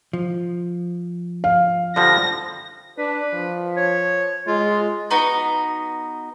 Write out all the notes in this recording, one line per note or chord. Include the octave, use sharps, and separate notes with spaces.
F3
F5
D3 F3 G3 A#6
D4 B4
F3
C#5
G#3 F4
B3 D#4 F#4